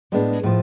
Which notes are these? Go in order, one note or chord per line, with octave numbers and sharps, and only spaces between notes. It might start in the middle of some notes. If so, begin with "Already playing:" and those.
A2 G#3 B3 D4
A2 F3